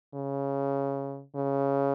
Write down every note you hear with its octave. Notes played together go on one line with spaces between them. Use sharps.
C#3
C#3